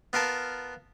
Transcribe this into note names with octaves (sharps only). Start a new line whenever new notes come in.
B3 F4 A#4 A5